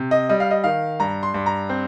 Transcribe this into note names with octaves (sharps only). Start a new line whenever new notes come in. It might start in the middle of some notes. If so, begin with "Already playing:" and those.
Already playing: C3
D#5
G3 D#5
F5
D#5
D#3 F5
G2 A#5
C6
G2
A#5
C4